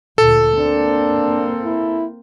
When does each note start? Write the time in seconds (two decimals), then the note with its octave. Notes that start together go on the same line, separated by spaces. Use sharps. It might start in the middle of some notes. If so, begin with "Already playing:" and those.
0.18 D2 A#2 A4
0.58 A#3 C4 D4
1.65 E4